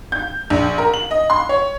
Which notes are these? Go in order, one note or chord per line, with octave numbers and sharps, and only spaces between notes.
G6
A#1
A#4
F#7
D#5
C6
C#5